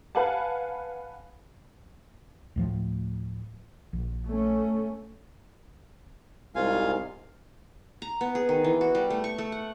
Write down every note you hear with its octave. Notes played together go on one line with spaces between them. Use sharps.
B4 F5 F#5 G#5 A5
D2 A2 F3
A#1
A3 C#4
C2 G#2 G#3 F4 F5 G#5
A#5
B3
G#4
D#3
E3
F#4
G3
A3
C#6
A3
F#5